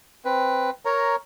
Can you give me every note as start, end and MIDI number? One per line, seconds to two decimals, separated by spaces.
0.25 0.70 60
0.25 0.70 71
0.85 1.16 70
0.85 1.16 73
0.85 1.16 82